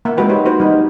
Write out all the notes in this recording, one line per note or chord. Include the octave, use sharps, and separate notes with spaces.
A#3 E5 F#5
G#3 C4 F#4 B4 G5
D#4 G4 C5 C#5
D#4 F#4 B4 C5
G3 D#4